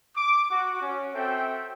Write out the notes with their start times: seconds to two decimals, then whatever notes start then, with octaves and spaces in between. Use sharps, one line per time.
0.16 D6
0.51 F#4
0.82 C#4
1.13 C4 F#4 A4 E5 G5